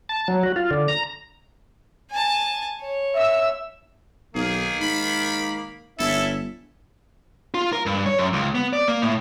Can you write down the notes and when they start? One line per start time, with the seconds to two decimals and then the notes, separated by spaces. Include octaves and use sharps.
0.09 A5
0.28 F#3
0.43 F#4
0.56 F4
0.71 D3
0.88 A#5
2.11 G#5 A5
2.81 C#5
3.15 E5 E6
4.35 B1 D#3 A#3 G#4
4.81 G#2 B5
5.99 G1 C#4 E4 A4 E5
7.54 F4
7.73 A#4
7.86 G2
8.06 C#5
8.19 F#2
8.33 C#2
8.55 B3
8.73 D5
8.88 A#3
9.02 A2